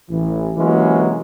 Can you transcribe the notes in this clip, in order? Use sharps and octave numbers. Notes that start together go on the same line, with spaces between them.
A1 E3
C3 E3 F#3 G#3 A#3 C#4